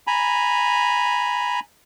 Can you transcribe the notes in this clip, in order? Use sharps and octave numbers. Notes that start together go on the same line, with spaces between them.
G#5 A#5 B5